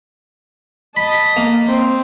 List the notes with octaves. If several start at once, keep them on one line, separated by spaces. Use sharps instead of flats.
D#5 A5 B5
A#3
C4